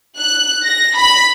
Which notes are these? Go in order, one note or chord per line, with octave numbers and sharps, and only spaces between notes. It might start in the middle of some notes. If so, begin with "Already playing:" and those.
F#6
A#6
B5